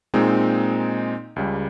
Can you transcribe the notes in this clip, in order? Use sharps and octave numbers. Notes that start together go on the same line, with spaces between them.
A#2 G#3 C4 D#4
C#2 C#3 G3